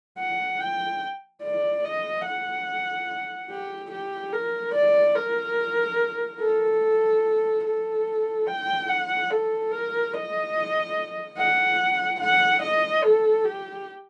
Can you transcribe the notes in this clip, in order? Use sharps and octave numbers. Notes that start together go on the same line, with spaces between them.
F#5
G5
D5
D#5
F#5
G4
G4
A#4
D5
A#4
A4
A4
G5
F#5
A4
A#4
D#5
F#5
F#5
D#5
A4
G4